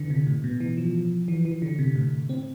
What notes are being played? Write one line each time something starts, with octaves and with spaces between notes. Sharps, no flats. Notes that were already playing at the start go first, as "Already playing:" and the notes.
Already playing: D3 E3
C3
A2
B2
E3
F3
E3
E3
D3
C3
A2
C4